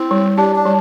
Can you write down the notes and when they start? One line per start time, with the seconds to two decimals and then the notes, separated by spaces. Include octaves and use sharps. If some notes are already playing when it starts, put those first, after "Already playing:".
Already playing: C4 E4
0.11 G3
0.37 D4 G4
0.56 D4
0.66 G3